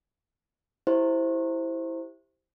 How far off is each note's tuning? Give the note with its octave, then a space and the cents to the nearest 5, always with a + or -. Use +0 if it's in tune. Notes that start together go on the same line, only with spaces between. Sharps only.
E4 +0 G4 +0 C5 +0